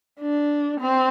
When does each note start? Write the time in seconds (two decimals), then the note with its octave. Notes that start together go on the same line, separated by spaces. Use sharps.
0.21 D4
0.80 C4